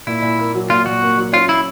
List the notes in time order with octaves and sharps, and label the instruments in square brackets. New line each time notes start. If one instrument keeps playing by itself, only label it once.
[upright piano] A#2 [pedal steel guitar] E4
[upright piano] A#2
A#3
F#3
[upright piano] A#2 [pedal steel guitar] F4
[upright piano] A#2 [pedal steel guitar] F#4
[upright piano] A#3
F#3
[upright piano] C#4 [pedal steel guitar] F4
[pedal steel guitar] E4